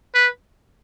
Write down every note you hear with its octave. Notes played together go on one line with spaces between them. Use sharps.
B4